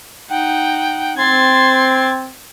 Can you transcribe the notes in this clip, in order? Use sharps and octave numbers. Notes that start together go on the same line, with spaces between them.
D#4 F#5 G5
C4 C6 G#6 A6